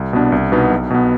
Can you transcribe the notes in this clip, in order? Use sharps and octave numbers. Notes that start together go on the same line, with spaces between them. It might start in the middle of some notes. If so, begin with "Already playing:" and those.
Already playing: C2
B2 B3 D4
C2
B2 B3 D#4
B1
B2 B3